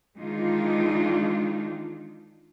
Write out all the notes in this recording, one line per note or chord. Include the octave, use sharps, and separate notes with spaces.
D#3 E3 G#3 D4 D#4 F4